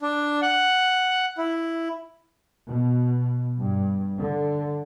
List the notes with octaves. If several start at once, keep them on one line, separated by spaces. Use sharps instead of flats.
D4
F#5
E4
B2
G2
D3